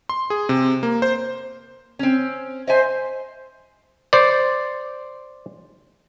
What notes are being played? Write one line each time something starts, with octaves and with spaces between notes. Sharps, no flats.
C6
G#4
C3
A#3
C5
C4 C#4
C5 D#5 E5 G#5
C5 D5